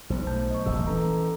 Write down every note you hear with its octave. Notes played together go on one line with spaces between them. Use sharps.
B1 B3 C5
A3 A5 G6
D#5 C#6
D#1 A#1 C3 E6
E3 C#4 A4 A#5